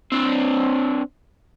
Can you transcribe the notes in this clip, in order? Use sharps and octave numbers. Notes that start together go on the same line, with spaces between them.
C4 D4